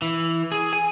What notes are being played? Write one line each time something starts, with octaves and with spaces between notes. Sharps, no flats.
E3
G#4
G#5